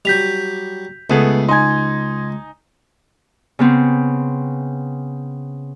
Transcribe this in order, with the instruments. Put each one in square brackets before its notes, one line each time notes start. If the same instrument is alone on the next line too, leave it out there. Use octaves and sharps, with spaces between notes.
[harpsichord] F#3 G3 [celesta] G6 B6 F7
[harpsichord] C#2 [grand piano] A3 B3 G#4
[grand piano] D#4 G#5 [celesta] C6 G#6
[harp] C#3 B3 C4